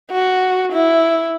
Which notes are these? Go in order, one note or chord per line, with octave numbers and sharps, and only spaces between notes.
F#4
E4